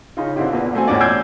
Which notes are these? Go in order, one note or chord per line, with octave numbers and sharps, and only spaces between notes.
C#3 D#4 F4
D3 C4 D4 E4 F4 G4
E2 A#2 B3
B2 A3 C4 G#5
A1 E2 A#2 C#4 D5
E6 G6 G#6 C7 D7